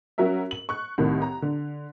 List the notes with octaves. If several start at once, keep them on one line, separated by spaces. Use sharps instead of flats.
F#3 C#4 F#4 A#4 E5
F#7
C#6 F#6
C2 A2 D#3
A#5
D3